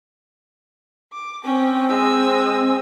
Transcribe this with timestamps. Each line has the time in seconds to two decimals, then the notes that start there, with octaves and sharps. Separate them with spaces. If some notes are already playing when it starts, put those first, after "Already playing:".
1.13 D6
1.44 C4 C#4 G5
1.89 G#3 E6